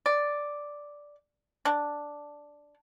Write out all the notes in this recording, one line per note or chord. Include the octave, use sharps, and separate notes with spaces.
D5
D4